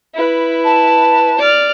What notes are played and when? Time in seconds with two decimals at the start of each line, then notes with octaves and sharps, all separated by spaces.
0.15 E4 B4
0.65 A5
1.39 D5 F6